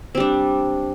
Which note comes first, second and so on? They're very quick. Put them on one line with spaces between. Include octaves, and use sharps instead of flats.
C4 G3 D4